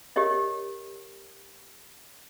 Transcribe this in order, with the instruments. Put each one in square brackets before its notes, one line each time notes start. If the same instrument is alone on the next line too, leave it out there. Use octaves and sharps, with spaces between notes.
[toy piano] G4 A#4 C#5 D#5